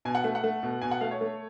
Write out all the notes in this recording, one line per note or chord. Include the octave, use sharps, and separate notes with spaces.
B2 G#5
F#5
A3
F#5
A3
B2
B2 G#5
F#5
A3 F5
C#5
A3